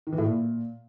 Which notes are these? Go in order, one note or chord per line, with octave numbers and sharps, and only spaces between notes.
D#3
E3
A2
A#2